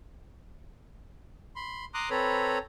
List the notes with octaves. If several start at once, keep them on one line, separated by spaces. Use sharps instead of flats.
B5 C6
A#5 C6 D6 D#6 F#6
C4 A4 B4 C#5 A#5 B5